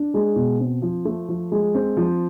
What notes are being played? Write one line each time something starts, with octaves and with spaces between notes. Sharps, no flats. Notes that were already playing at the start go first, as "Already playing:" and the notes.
Already playing: D4
G#3
B2
C4
F3
A3
F3
G#3
C4
F3